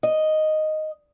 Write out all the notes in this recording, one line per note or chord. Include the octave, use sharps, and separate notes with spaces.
D#5